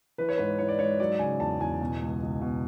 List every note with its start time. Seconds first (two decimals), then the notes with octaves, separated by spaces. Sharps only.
0.18 E3 B4
0.29 C#5
0.38 G#2 B4
0.58 E3 C#5
0.68 D5
0.79 G#2 C#5
1.00 F#3 D5
1.19 C#3 G#5
1.40 E2 A5
1.60 E2 G#5
1.81 B2
2.01 C#2
2.21 C#2
2.41 B2